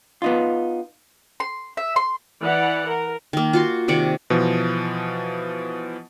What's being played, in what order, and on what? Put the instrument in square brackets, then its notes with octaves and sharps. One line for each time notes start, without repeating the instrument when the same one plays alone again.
[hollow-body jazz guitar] B3 D#4 F4
[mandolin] C6
E5
C6
[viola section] E3 D5 F#5
A#4
[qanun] D#3 A#3
F4 F#4 C6
C3 D#3 D5 F#5
[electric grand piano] B2 E3 F3